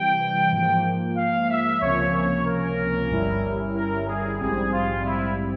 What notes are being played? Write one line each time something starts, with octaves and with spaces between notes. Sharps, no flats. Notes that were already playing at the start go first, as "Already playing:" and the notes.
Already playing: C3 E3 G3 G5
G#2 F3 A#3
F5
E5
C#2 C3 F3 A#3 C#4 C#5
C#5
A#4
G1 G2 G3 C#4 E4
A#4
G#4
A#1 G#2 G3 C4 G#4
F4
E4